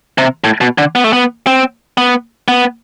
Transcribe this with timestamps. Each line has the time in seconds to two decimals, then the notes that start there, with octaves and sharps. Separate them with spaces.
0.18 C3
0.44 A2
0.61 B2
0.78 D3
0.95 B3
1.04 A3
1.13 B3
1.47 C4
1.98 B3
2.48 B3